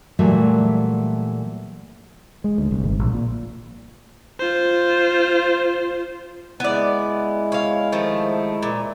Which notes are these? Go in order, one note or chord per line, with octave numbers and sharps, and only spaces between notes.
A#2 E3 F#3 G3 A3
G#3
D2
C2
G#1
A#1
A#2
F4 C5
G#3 B3 E4 D5
C#5 F5
D#3 F3 A3
A#2